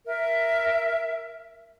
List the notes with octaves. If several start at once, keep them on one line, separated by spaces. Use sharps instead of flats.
A#4 E5